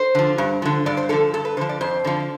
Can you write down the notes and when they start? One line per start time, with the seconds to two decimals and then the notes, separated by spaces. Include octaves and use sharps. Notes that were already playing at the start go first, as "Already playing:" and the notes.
Already playing: C5
0.15 D3 F3
0.38 G2
0.62 D3 F3
0.86 G2 D5
0.97 C5
1.09 D3 F3 A4
1.34 G2 A4
1.45 B4
1.57 D3 C5
1.61 F3
1.69 D5
1.81 F2 C5
2.05 D3 F3